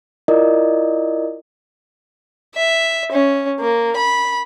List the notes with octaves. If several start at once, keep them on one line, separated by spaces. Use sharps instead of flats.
E4 F4 A#4 D5 D#5
E5
C#4
A#3
B5